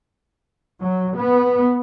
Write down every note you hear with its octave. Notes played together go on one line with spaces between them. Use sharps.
F#3
B3